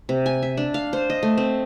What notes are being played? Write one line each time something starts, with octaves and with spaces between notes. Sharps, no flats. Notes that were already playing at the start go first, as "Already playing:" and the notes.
C3
G#5
E5
D4
F5
C5
D#5
A3
C4